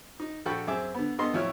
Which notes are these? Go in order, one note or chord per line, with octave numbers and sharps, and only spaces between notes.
D#4
A#1 F#4 A4 G5 B5 C#6
F#2 C4 G#4 E5 D6
D3 B3
G2 B3 A4 D#5 C6
F2 A2 F#3 E4 C#5 F6